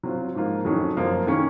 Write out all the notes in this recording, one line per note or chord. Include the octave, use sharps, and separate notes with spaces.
F#3 C4 F4
G#2 F3 A#3 F4
F2 D#3 F#3 C#4
F#2 F3 A#3
D#3 A#3 C#4